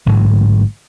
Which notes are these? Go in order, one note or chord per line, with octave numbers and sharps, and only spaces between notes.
A1 G#2 D3 F#3